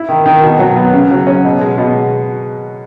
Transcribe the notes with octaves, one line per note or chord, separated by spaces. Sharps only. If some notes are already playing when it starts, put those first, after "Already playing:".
Already playing: E4
D#3
D#3
B2
F#3
B3
C#3
F#3
C#4
B2
G#3
B2